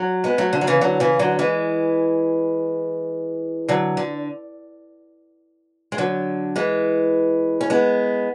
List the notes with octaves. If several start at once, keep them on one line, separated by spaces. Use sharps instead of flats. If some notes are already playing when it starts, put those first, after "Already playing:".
Already playing: F#3
G#3 B3
F#3 A3
D3
F#3
C#3 E3
D3 F#3
C#3 E3
D3 F#3
E3 G#3
D3 F#3
D3
G#3
D3 F#3
E3 G#3
C#4
G#3 B3